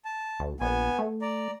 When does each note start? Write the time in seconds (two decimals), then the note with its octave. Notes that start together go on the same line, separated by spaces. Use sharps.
0.05 A5
0.39 D2
0.61 A#1 B3 G#5
0.99 A3
1.22 D5 A#5